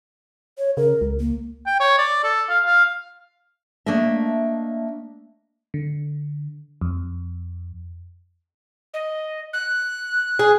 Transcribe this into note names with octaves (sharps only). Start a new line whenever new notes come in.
C#5
C#3 A#4
C#2
A#3
G5
C#5
D5
A4
F5
F5
A3 A#3 D4 D#5 E5
D3
F2
D#5
F#6
G#4